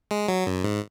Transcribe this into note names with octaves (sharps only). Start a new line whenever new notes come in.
G#3
F#3
F#2
G#2